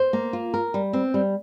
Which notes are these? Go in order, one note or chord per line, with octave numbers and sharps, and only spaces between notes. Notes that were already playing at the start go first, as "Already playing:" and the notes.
Already playing: C5
A#3
F4
A#4
G3
C4
G3